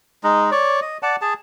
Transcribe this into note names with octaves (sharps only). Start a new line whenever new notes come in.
G#3 D#4
C#5 D5
D#5
D5 F#5 A5
G#4 A5